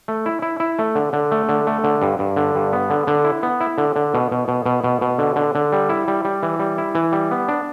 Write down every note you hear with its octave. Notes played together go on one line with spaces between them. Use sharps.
A3
E4
E4
E4
A3
D3
D3
A3
D3
A3
D3
G2
G2
D3
G2
B3
D3
D3
E4
B3
E4
D3
D3
B2
B2
B2
B2
B2
B2
D3
D3
D3
G3
E4
G3
G3
E3
G3
E4
E3
G3
B3
D4